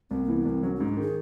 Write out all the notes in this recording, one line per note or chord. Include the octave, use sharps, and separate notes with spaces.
C2 C4
E3 A#3
B3
C2 C4
F#3 C#4
G#2 C#4
D4
D#3 G#4